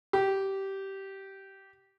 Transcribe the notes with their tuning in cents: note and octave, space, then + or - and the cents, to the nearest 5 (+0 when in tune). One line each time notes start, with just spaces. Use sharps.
G4 -15